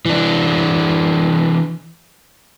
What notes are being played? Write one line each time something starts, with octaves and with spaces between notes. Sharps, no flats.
E3 D4